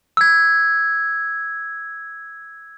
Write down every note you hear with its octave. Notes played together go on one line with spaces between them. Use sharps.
E6 G#6